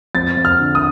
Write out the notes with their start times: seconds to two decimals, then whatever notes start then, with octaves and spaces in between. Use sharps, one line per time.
0.15 F2 A6
0.37 F2
0.45 F6
0.59 D3
0.75 D#6